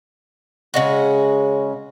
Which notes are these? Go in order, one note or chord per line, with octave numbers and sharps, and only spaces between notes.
C#3 G#3 F#4